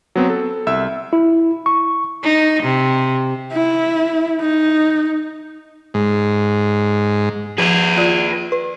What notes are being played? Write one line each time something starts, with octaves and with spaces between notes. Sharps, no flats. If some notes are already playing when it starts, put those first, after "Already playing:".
F#3 B3 C4
A4
C2 E5 E6
E4
C#6
D#4
C3
E4
D#4
G#2
F3 G#4 B4
F4 D5
B4